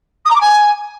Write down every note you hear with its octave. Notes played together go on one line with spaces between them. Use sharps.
D#6
A#5
D6
G#5